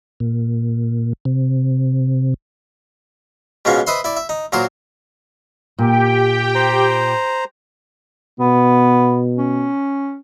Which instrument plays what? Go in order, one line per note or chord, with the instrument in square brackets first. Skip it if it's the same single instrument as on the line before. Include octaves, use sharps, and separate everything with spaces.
[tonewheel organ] A#2
C3
[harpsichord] G#2 B2 G#3 C#4 F4
B4 C5 D#5 E5 B5 C6
E4 D5
E5
D#4
A#2 F#3 A#4 C5
[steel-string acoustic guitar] A#2 [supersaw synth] G4 G5
[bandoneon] C5 A#5
[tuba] B2 [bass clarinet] B3
[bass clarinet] C#4